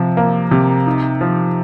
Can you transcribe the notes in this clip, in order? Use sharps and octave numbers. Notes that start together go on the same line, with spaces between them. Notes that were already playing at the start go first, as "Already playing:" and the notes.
Already playing: C3 F3
A#3
C3
D#4
F3